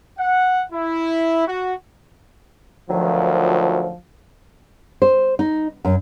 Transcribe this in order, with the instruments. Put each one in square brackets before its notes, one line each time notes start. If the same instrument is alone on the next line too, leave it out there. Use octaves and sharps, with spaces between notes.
[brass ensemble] F#5
E4
F#4
[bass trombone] D2 [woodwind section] D#3 F#3 [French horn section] F3
[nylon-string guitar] C5
D#4
F#2